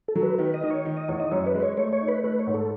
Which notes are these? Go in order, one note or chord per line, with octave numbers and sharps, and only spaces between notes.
A4
F#3
B4
D#3 B4
D#5
D#3
C#5
D#3
D#5
E2 C#5
D#5
F#2 C#5
B4
G#3
C#5
A3 C#5
C#5
D#4
B4
A3 B4
C#5
G#2
A4